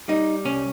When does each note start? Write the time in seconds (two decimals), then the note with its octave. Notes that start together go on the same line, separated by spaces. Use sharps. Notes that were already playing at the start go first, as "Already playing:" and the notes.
0.08 G3 D#4
0.45 C2 C#4